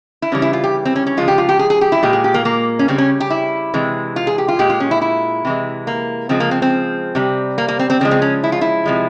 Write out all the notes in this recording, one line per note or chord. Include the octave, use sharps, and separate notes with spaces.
E4
C#3 E3 G3 C#4
E4
F4
G4
C4
C#4
C#4
C#3 F3 G#3 F4
G4
F4
G4
G#4
G#4
G4
E4
A#2 G#3 G4
G#4
G4
A#3
A#3
C#4
C#3 G3 C4
C#4
G4
E4
C3 E3 G#3
F4
G#4
G4
F4
A#2 G#3 G4
F4
C#4
E4
E4
C3 E3 G#3
A#3
C#3 F3 G#3 C4
A#3
C4
C4
C3 G3
A#3
A#3
C4
C4
C#3 F3 G#3 C4
C4
C#4
E4
F4
E4
C3 F3 G#3